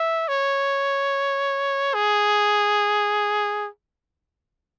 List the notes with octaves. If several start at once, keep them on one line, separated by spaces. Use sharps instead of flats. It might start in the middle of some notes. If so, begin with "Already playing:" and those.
Already playing: E5
C#5
G#4